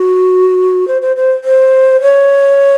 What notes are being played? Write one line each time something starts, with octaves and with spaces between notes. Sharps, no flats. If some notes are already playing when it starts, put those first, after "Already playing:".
Already playing: F#4
C5
C5
C5
C5
C#5